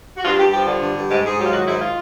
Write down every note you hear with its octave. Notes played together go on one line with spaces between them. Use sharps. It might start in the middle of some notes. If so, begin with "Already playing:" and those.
F#4
G2 F4
G2 G4
F3 G4
D3
G2
G2
G#2 G4
G#2 G#4
F#3 G4
F4
D#3 F#4
G#2 E4
F4